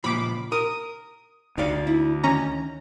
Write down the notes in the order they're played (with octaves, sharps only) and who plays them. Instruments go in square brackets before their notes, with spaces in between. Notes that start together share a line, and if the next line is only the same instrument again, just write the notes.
[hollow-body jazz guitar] C#2 A#2 F3 [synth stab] B5 D6
[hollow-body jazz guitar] A#4 [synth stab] D#6
[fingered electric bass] D2 [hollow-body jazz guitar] D#4 D5 F5
[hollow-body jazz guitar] E4
[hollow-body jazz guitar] D#3 [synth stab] C#4 A#5